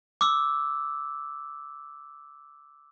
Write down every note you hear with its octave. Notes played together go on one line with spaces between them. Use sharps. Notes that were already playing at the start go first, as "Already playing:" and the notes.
D6 E6